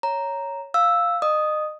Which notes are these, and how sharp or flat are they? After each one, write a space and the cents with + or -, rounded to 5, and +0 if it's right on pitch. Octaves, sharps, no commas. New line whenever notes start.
C#5 +0 A#5 +0
F5 +0 E6 +0
D#5 -30 D#6 +0